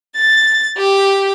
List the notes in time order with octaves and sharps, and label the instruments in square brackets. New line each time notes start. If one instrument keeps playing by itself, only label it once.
[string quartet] A6
G4